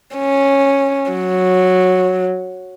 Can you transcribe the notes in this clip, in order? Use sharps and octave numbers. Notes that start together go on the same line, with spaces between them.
C#4
F#3